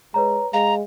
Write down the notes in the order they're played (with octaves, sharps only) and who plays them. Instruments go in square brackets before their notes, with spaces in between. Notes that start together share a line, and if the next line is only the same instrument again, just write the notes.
[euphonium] G#3 [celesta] B4 C#5 A#5
[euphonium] G#3 [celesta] F5 [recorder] A#5